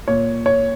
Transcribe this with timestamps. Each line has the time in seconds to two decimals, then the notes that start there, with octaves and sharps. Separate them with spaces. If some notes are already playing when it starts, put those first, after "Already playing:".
0.08 A#2 C#5
0.46 C#5